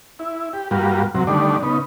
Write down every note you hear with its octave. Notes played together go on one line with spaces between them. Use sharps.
E4
G4
G2 G3 A#3 F4 F#4
F#2 C3 F#3
D3 D#3 G3 A3 D4
C#3 B3 D#4